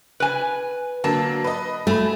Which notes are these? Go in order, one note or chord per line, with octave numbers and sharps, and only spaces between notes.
B4 G#5
D3 F#3 A#3 A5
B4 D#5
A3 G#5 B5